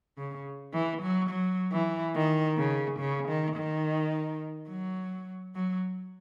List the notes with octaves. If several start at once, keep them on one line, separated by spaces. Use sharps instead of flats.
C#3
E3
F#3
F#3
E3
D#3
C#3
C#3
D#3
D#3
F#3
F#3